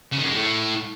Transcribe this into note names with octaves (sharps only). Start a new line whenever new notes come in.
C#3
D#3
F#2
G#3
A2